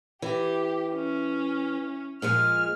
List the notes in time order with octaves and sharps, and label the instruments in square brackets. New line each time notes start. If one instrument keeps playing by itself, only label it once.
[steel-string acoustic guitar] E3 [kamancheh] G4
[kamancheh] C#4
[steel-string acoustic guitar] A#2 F3 G#3 [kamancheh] F6